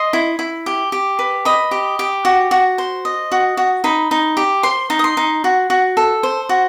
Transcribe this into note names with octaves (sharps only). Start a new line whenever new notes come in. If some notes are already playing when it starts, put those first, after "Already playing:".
Already playing: D#5 C6
E4
E4
G4
G4
B4
D#5 B5
G4
G4
F#4
F#4
C5
D#5
F#4
F#4
D#4 B5
D#4
G4
C5 C6
D#4
D#6
C6
D#4
F#4
F#4
A4
C5
F#4